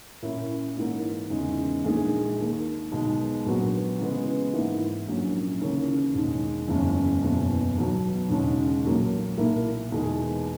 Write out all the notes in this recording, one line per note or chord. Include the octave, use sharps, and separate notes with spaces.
A#2 A#3 C#4 E4
G#2 E3 A#3
E2 C#3 G#3 D#4
A#1 A#2 G#3 D#4 G#4
D#2 D#3 A#3
B1 B2 G#3 D#4
A#1 A#2 F#3 B3 F#4
C#3 E3 G#3 B3
G#1 G#2 E3 A#3 E4
A#1 A#2 F#3 C#4
D#2 C#3 E3 A#3 C#4
E1 D#2 D#3 G#3
F#1 E2 C#3 G#3 C#4
F#1 E2 B2
B1 B2 F#3
E1 D#2 C#3 G#3 C#4
B1 A#2 F#3 A#3
B1 A#2 A#3 E4 A#4
E2 B2 G#3 D#4 G#4